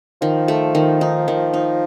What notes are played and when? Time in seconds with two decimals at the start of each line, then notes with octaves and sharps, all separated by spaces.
0.22 D#3 F3
0.48 A3
0.75 D#3
1.01 D#4
1.28 D#3
1.54 D#4